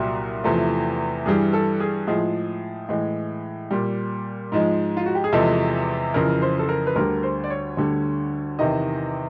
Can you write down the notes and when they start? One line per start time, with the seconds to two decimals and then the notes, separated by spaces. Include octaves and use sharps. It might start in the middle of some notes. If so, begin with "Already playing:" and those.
Already playing: C2 A#2 F#3 G4
0.44 E2 C3 F3 A3
1.26 G2 E3 G3 G#4
1.53 A4
1.80 G#4
2.07 A2 F3 G#3 G#4
2.89 A2 E3 G#3
3.71 A#2 G3
4.52 G#2 F3 G#3
4.97 F4
5.06 F#4
5.15 G4
5.24 G#4
5.33 E2 C3 F3 G#3 A4
6.14 F2 C#3 E3 A#4
6.42 C5
6.59 A4
6.69 A#4
6.87 B4
6.96 D2 D3 G3 A#4
7.23 C5
7.44 D5
7.50 C#5
7.77 D2 D3 G3
8.59 E2 C3 D#3 D#5